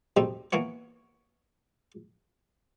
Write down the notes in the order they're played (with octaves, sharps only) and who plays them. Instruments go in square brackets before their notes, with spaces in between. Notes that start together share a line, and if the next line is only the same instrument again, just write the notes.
[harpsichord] D2 G3 C4 D#4 E5 A#5
E3 A#3 B3 C#5